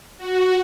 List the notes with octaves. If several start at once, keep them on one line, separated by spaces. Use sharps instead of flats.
F#4